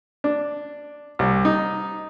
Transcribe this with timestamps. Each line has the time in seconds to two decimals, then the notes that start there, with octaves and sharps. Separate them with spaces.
0.24 D4
1.19 C2
1.45 D#4